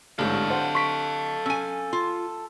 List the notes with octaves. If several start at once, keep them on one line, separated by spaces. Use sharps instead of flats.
A1 G#2 D3 G4 A4 C#5 F5
C5 F#5
C#6 B6 D7
C#4 G#5 E6 D#7
F4